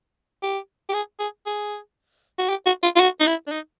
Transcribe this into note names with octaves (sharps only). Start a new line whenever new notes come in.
G4
G4
G#4
G#4
G#4
F#4
G4
F#4
F4
F4
F#4
D#4
E4
D4
D#4